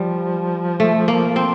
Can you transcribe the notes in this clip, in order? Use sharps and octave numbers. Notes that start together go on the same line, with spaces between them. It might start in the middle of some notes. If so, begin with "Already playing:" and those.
Already playing: F3 G3
A3
A#3
C4